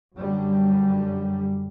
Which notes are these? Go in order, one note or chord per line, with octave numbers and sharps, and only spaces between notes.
F#2 D3 G3